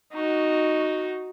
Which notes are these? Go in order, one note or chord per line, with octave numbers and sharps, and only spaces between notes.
D#4 F#4